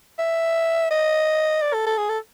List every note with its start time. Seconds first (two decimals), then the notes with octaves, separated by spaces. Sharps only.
0.19 E5
0.91 D#5
1.62 D5
1.74 A4
1.86 A4
1.98 G#4
2.09 A4